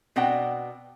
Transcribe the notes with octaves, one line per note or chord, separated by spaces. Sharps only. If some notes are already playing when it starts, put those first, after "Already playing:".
B2 C4 D4 F#5 G5